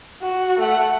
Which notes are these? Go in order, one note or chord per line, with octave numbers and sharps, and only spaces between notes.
F#4
A3 F#5